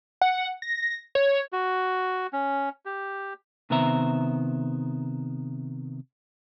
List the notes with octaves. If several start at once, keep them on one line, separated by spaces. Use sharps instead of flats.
F#5
A#6
C#5
F#4
C#4
G4
C3 D#3 B3 C5 E5 A#5